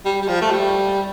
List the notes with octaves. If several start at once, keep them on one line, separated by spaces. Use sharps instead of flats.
G3
G3
F3
A3
G3